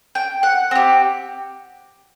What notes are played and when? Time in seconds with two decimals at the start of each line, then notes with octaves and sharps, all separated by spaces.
0.15 G5
0.43 F#5
0.71 C4 G4